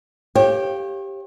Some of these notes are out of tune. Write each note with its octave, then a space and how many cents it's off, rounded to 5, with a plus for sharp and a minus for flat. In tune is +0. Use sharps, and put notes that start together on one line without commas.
G4 +0 C#5 -40 F5 +0